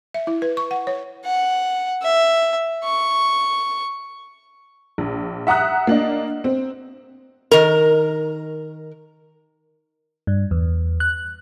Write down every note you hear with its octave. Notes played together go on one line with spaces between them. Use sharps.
E5
E4
B4
C#6
F#5
C#5
F#5
E5
C#6
A#1
E5 F#5 A#5 D#6 F#6
A#3 D4 D#5
C4
D#3 A#4
G2
E2
F#6